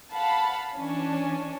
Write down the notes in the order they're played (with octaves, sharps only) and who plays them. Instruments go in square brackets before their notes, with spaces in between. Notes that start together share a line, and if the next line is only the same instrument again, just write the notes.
[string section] F5 F#5 A5 B5
E3 C#4 D4